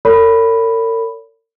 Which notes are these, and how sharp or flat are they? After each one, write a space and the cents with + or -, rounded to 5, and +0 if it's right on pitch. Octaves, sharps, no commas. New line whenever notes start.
A#4 -45 C#5 +35 B5 +0